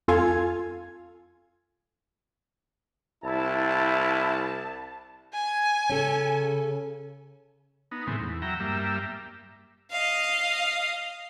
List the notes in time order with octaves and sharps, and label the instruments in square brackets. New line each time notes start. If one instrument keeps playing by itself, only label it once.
[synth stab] F2 F4 A4 F5 G#5 G#6
[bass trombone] C2 [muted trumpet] E4 [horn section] A5
[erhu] G#5
[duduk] C#3 [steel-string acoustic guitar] C#4 A4
[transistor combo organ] B3 D#4
A2 C#3 E3 G#3 C4
E2
F#3 E5 G5 A#5
G2 G3 A#3 E5
[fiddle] D#5 F5